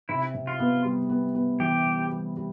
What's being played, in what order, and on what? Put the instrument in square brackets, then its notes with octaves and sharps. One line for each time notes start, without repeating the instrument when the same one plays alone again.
[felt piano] C3 [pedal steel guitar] E4
[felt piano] C3
[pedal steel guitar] F4
[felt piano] B3
G3
B3
B3
[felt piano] E3 [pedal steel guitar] G4
[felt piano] G3
G3
G3